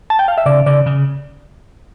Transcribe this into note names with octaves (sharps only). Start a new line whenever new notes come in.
A5
G5
F5
E5
C#3 D5
C#3 D5
C#3